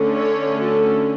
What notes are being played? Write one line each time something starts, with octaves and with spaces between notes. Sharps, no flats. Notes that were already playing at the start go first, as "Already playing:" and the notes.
Already playing: D3 A3 C#4
A4 C#5
F#4 A4